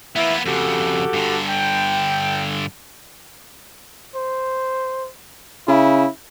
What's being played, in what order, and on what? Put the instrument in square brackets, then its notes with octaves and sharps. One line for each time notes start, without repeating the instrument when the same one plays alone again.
[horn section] E3 E4 E5 [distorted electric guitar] A#3 B3
[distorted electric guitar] F2 C#3 [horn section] F#4 G4 A4
[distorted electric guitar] G2 D3
[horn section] G5
[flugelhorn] C5
[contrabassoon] C#3 [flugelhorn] E4